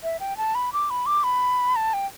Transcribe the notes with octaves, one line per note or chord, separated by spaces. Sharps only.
E5
G5
A5
B5
D6
B5
D6
B5
A5
G5